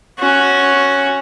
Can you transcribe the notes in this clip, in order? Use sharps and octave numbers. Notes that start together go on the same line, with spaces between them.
C#4 F#4